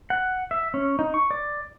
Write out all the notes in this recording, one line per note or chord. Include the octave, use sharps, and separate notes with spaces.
F#5
E5
C#4
D#4
C#6
D5